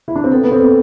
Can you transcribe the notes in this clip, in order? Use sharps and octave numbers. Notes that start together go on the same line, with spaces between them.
E4
D4
C4
B3 A4
B3
C4 A4
B3